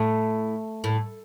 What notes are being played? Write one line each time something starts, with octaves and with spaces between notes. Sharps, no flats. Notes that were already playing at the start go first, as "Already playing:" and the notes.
Already playing: A2 A3
A2